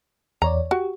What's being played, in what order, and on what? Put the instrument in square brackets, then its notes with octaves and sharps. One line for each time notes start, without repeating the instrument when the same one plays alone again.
[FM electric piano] E2 C#5 D5 [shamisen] A#5
[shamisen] F#4 [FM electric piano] G4